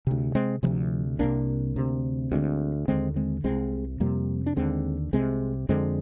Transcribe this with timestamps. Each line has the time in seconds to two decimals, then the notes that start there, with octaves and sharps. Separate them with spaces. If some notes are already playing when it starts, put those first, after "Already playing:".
0.07 D2 C3
0.35 G#3 C4
0.63 C3 F3 G#3
0.67 D2
1.19 C2 C3 A#3 D4
1.76 D2 C3
2.32 D2 D3 G#3 C4
2.88 D#2 D3 G#3 C4
3.16 G#3 C4
3.44 C2 C3 G#3 C4
4.00 F2 C3 G3 A#3
4.46 D4
4.56 D#2 D3 G#3 C4
5.13 C2 C3 G#3 C4
5.69 F2 D3 G#3 C4